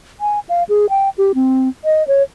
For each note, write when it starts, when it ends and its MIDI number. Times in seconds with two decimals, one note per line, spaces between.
0.20 0.39 80
0.49 0.63 77
0.69 0.86 68
0.90 1.09 79
1.18 1.32 67
1.35 1.69 60
1.85 2.06 75
2.08 2.23 73